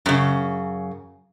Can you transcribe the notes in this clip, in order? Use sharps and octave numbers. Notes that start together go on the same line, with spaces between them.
F#2 C#3